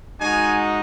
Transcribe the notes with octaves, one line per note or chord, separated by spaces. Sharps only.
G#3 D#4 F#4 G#5